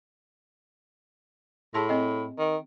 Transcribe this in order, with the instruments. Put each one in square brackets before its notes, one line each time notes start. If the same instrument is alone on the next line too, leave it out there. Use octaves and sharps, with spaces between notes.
[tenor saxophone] A2 [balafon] G#4 A5 C6
[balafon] C4 D#5
[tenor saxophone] D#3